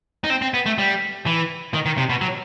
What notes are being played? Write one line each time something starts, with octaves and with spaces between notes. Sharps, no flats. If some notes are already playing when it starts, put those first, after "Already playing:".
D#4
C4
C4
B3
A3
G3
E3
D#3
D#3
C3
B2
F#3